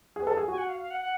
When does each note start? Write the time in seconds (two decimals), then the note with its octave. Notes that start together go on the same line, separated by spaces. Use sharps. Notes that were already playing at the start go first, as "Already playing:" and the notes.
0.16 G#4
0.22 B4
0.27 A4
0.37 G#4
0.48 F#4 G#5
0.58 F#5
0.69 F5
0.80 F5
0.91 F#5
1.01 F#5